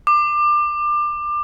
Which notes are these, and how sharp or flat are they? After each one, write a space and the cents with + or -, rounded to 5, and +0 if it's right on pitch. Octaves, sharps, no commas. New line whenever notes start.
D6 +25